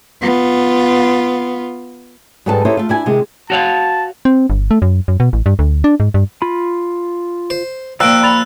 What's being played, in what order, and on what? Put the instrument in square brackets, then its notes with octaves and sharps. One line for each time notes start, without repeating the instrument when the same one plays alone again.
[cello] B3 F4
[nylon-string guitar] G#2 G3 C4 A4 B4 A5
D#4 E4 G4 A4 C5 C#5
A3 F4
D4 E4 G#5
C3 D#3 G#3 F4
[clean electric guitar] F#4 C#5 F5 [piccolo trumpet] A5
[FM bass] C4
G1
A3
F#2
F#2
B2
A1
G2
D2
D4
G#2
G2
[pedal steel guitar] F4 B5
[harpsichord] C5
[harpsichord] A#2 F3 [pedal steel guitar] D5 A#5 [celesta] G5 D7 [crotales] E6 F#6
[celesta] B5 A6 F7